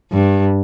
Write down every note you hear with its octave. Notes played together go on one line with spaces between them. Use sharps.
G2